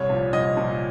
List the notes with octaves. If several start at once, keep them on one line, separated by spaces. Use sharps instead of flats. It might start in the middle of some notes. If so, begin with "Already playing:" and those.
Already playing: C2 C#5
A#2 F3
C2 D#5
A#2 F3